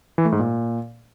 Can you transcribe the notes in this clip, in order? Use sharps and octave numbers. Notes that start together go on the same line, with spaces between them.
E3
A3
G#2
A#2